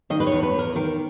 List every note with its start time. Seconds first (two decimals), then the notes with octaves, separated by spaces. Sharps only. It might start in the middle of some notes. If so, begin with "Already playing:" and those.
0.10 D#3 D#5
0.20 B4
0.27 C#5
0.32 E2
0.43 B4
0.53 E2
0.59 A#4
0.75 D#3 A#4